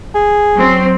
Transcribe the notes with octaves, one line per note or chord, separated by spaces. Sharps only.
G#4
F#3 C4